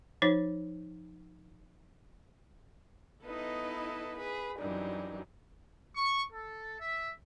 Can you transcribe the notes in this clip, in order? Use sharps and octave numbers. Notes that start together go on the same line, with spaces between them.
F3 D#4 C5 C#5
B3 D#4 E4 A4 B4 D#5
G#4 B4 B5
F#2 E3 F#3 G3 D4 D#4
C#6
A4
E5